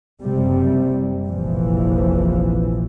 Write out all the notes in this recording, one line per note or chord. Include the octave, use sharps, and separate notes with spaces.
F#1 C3 G3
F1 A#1 E3 F3